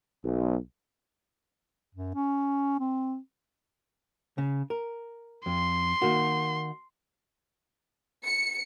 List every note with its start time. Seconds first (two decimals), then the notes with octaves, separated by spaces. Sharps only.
0.25 B1
1.95 F#2
2.15 C#4
2.80 C4
4.38 C#3
4.70 A#4
5.46 F2 C6
6.02 D#3 A#3 F#4
8.25 C#7